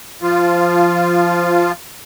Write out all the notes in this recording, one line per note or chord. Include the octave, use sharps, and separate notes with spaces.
F3 F4